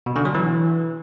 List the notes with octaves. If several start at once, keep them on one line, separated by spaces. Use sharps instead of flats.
B2
D3
F#3
E3